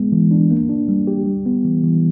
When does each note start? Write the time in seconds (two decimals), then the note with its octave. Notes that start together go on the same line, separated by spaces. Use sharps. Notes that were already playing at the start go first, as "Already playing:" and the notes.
Already playing: G#3 B3
0.12 E3
0.31 D4
0.51 A#3
0.69 D4
0.88 G3
1.07 G4
1.26 G3
1.46 B3
1.65 E3
1.83 E3